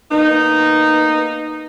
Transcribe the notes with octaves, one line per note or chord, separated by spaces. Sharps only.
A#3 B3 D#4